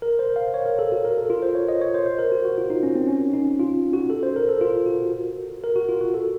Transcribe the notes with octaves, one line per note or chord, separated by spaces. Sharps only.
A#4
C5
F5
C#5
A#4
A4
F#4
A#4
A4
F4
C5
C#5
D#5
C#5
C5
C5
A#4
F#4
F#4
F4
D#4
C#4
C4
C#4
D#4
F4
F#4
A4
C5
A#4
A4
F4
F#4
A#4
F#4
F4
F#4
A4